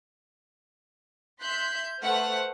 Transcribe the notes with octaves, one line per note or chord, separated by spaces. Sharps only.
E5 C6 F#6 G6 B6
A3 B4 C5 F#5 F6